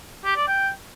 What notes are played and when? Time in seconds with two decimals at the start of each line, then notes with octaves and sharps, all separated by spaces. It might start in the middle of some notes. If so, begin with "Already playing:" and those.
0.25 G4
0.36 D5
0.48 G5